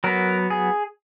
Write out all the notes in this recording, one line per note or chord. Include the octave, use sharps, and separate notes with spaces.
F#3 B3 A#4
G#4